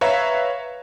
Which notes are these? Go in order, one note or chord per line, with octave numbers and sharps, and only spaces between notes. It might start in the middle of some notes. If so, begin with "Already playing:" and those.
B4 C#5 E5 F5 A#5